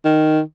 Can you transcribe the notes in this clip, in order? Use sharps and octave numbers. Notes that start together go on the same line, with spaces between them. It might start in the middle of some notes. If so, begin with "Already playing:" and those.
D#3